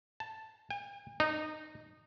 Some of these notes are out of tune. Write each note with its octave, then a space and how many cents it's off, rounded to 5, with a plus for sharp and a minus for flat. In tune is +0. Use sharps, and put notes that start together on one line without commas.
A5 +0
G#5 -45
D#4 -20